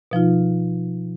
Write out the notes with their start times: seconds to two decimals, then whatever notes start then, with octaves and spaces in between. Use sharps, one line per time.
0.11 B2 F3 D#4 F4